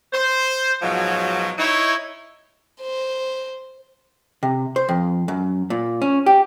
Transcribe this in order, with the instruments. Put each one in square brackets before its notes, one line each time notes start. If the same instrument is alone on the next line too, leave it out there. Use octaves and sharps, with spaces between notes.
[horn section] C5
G#2 B2 F3 F#3
D#4 E4 C#5
[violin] C5
[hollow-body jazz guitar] C3
C5
F2
F#2
A#2
C#4
G4